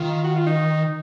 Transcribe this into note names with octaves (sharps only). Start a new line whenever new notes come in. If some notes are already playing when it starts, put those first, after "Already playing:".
Already playing: D#3 F4
F#4
F4
D#4